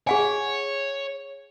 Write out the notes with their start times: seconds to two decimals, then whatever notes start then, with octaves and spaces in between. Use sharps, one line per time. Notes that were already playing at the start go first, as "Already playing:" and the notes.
0.07 G#4 C#5 F#5 G#5